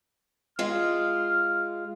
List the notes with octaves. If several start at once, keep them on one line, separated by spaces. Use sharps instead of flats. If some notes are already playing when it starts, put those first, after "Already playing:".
G#3 F4 F6